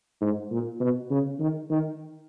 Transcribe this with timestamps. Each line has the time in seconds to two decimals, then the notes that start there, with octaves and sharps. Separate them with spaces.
0.21 G#2
0.51 A#2
0.80 B2
1.10 C#3
1.39 D#3
1.70 D#3